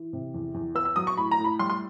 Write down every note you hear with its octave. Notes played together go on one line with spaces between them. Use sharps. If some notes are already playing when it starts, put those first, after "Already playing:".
Already playing: E3
C3
E2
E2
B3 E6
E6
F#3 D#6
C#6
A2 B5
A#5
A2
B5
G3 C6
C6